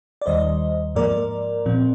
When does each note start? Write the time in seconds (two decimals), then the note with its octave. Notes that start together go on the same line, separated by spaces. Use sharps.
0.22 D5
0.26 D#2 D#3 G3 C5 D#5
0.95 G#2 F3 A#3 A#4 D5
1.66 A#2 F3 C4